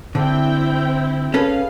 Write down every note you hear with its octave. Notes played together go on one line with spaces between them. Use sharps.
D3 C4 E4 G5
C#4 G#4 A4 B4 F5